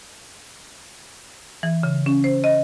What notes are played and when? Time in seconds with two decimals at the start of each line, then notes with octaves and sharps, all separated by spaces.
1.63 E3
1.83 C#3
2.06 C#4
2.24 C5
2.44 D#5